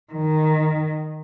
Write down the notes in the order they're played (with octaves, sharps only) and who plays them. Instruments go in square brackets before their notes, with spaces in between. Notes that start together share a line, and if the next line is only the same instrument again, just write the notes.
[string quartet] D#3